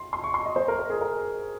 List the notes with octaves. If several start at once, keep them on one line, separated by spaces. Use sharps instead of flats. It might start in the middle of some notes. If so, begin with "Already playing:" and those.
Already playing: C6
C6
C#6
C6
D#5
C5
A#4
A#4
G#4
A#4